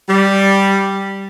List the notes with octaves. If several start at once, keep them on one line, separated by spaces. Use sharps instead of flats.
G3